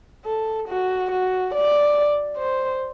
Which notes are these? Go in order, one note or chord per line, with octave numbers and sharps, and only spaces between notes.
A4
F#4
F#4
D5
C5